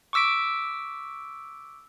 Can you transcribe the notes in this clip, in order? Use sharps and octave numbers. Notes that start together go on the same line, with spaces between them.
C#6 D6 E6 B6 D7